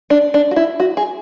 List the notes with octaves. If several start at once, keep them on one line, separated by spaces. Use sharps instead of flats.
D4
D4
F#4
E4
F#4
G#4